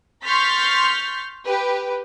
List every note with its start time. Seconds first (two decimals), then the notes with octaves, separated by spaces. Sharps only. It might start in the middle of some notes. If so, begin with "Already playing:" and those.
0.24 C6 C#6 F6 G6 A6 B6
1.45 G4 B4